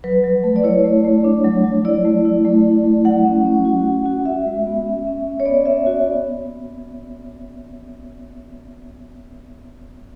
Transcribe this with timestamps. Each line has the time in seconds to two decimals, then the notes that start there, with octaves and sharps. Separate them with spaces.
0.04 F#3 B4
0.24 F#3
0.44 A3
0.56 D5
0.63 E4 C#5
0.84 A3
1.04 A3
1.24 D4
1.45 F#3
1.64 F#3
1.85 E4 D5
2.05 A3
2.25 E4
2.45 A3
2.65 E4
2.84 A3
3.05 F#3 F#5
3.25 C#4
3.45 C#4
3.65 F#4
3.86 F#4
4.05 F#4
4.25 F#4 E5
4.46 G#3
4.66 B3
4.86 C#4
5.07 C#4
5.26 C#4
5.40 C#5
5.46 B3 D5
5.66 B3 E5
5.86 B3 F#4
6.06 B3